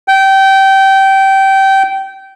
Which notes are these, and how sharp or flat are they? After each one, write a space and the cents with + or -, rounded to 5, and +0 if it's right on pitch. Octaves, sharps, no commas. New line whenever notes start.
G5 -20